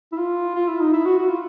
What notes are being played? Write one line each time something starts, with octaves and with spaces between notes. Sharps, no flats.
E4
F4
F4
E4
D#4
E4
F#4
F#4
F4